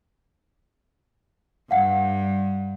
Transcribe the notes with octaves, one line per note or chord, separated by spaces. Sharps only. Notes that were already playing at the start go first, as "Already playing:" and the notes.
G2 F5 F#5